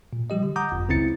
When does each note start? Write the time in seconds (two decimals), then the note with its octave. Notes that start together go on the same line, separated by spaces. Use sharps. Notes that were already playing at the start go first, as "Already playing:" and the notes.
0.13 A#2
0.30 F3 G3 G4 D#5
0.43 D3
0.56 F#5 A#5 D6 D#6 G6
0.72 G1 F2
0.89 C#2 C#3 C4 E4 A6 C#7